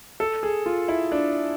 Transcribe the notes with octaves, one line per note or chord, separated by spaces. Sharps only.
A4
G#4
F4
E4
D4